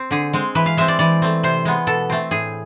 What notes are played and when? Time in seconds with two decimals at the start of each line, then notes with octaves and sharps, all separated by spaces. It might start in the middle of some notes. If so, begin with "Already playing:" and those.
Already playing: C4
0.11 D3 G#4
0.33 G#3 C4
0.55 E3 B4
0.66 F5
0.77 G#3 C4 E5
0.88 D5
0.99 E3 D5
1.22 A3 C4
1.43 C3 C5
1.65 G#3 B3
1.87 B2 A4
2.10 A3 C4
2.31 A2 G#4